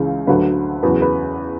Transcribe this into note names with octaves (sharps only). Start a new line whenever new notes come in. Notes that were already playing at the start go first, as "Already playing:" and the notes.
Already playing: C#2 C#3 E3
D2 D3 F#3 B4
E2 C#3 F#3 B4
B4